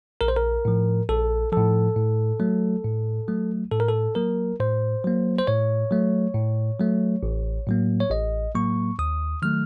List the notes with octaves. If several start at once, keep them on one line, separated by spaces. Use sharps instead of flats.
A#1 A#4
C5
A#4
A2 F3
A#1 A4
A2 F3 A4
A2
F#3 A3
A2
F#3 A3
A2 A4
A#4
A4
F#3 A#3 A#4
A2 C5
F#3 A#3
C5
A2 C#5
F#3 A3
A2
F#3 A3
A1
A2 F#3 A#3
C#5
A1 D#5
A2 F#3 A#3 C#6
D#2 D#6
D#3 F#3 A3 F6